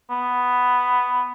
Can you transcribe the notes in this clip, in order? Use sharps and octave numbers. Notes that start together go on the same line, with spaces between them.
B3